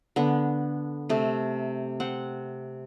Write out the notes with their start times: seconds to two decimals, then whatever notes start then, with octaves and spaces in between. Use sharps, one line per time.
0.16 D3 B3
1.09 C3 A3
2.00 C4 F#5